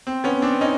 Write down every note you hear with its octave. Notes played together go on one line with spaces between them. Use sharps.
C4
B3 C#4
C4 D4
C#4 D#4